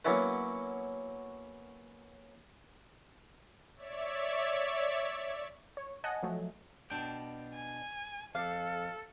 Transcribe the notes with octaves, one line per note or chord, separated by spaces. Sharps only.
F#3 A#3 B3 C#4 E4 B4
C#5 D5 E5
C#5
D#5 F#5 G#5 A5
F3 F#3 A3
B2 D4 G5
G#5
F2 A4 F5